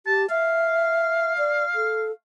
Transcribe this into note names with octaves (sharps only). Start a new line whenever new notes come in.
G4 A5
E5 F5
D5
A4